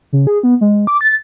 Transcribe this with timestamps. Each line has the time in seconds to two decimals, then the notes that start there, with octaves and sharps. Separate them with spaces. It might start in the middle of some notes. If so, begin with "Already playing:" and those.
0.13 C#3
0.27 G#4
0.43 B3
0.61 G#3
0.87 D6
1.01 A6